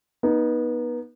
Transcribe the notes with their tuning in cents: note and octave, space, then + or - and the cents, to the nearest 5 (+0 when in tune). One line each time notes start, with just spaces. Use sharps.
B3 -30 D#4 +0